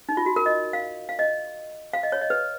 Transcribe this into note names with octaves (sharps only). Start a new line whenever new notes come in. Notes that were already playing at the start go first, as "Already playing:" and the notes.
D#4
F4
F#4
A#4
D#5
F5
F5
D#5
F5
D#5
C#5
D#5
B4